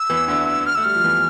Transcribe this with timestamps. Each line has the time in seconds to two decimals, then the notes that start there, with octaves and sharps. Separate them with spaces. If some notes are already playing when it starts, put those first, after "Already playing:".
Already playing: E6
0.10 E2 E3
0.28 D2 D3
0.66 F6
0.75 A3 E6
0.84 G3 F6
0.95 F3
1.04 E2 E3